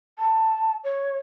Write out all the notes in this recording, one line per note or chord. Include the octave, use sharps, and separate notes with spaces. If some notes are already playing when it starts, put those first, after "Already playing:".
A5
C#5